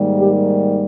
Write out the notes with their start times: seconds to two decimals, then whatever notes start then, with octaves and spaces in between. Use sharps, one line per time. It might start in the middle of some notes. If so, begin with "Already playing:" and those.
Already playing: G#2 D#3 G3 A#3
0.19 G4